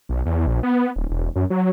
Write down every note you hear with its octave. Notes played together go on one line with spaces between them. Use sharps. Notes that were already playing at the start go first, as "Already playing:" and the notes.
B1
E2
A#1
B3
D1
E1
F#2
F#3